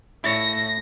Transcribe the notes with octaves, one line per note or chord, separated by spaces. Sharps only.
A2 E4 C#5 A#6